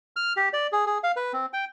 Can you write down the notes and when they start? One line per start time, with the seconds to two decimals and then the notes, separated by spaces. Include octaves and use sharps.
0.16 F6
0.37 G4
0.53 D5
0.72 G#4
0.86 G#4
1.04 F5
1.16 B4
1.33 C4
1.53 G5